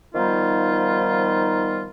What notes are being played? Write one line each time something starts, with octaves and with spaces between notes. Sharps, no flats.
D#3 F3 G3 B3 D#4 F4